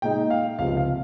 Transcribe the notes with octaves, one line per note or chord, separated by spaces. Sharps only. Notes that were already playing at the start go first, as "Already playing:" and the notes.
A#2 G#3 D#4 G5
F5
C#2 C3 F3 F5
F5